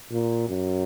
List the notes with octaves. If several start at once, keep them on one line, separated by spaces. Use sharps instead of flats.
A#2
F#2